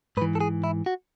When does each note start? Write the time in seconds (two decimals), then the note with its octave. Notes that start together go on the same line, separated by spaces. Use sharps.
0.17 G#2 B4
0.22 E3
0.35 A4
0.41 G#4
0.64 E4
0.86 F#4